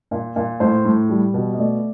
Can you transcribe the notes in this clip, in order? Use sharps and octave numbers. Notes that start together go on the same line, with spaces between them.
A#2
A#2
A2 C5
A2
G3
B2
D#5
A3 D5